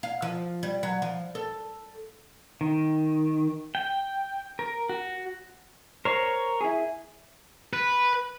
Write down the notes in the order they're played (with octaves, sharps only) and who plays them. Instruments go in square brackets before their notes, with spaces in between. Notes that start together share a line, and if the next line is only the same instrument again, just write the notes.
[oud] F5
F3
G3
F#3
F3
A4
[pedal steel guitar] D#3
G5
A#4
F#4
[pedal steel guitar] A#4 C#5 [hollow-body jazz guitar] C5
[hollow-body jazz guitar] E4 G#4
[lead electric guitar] B4